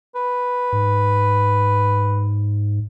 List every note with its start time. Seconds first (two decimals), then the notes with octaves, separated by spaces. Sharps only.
0.15 B4
0.73 G#2